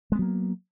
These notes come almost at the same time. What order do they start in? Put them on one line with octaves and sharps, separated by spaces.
G#3 B3 F#3 A#3